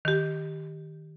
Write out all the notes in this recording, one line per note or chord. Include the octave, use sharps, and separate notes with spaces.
D#3 G4